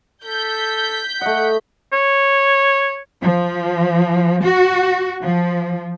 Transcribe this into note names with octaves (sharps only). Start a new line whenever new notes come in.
A4 G6 B6
A3 D#5 F#5
C#5
F3
F#4
F3